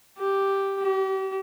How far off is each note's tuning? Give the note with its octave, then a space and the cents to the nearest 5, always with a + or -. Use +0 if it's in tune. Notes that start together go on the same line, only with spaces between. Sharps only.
G4 +0
G4 -35